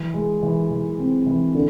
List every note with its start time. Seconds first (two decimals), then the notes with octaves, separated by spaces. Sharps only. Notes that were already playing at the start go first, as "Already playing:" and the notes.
Already playing: E3
0.14 G#3
0.43 E3
0.71 E3
0.99 C4
1.26 E3
1.54 D3